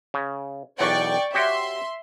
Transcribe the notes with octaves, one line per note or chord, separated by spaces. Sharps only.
C#3
B1 E2 D5 F#5 G5 C#6
F#4 G4 C#5 E5 C6